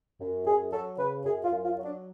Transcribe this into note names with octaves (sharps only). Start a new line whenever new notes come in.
F#2
F#2 G#4
F#3 A4
C#3 B4
F#2 G#4
F4
F#2
F4
F#3
D4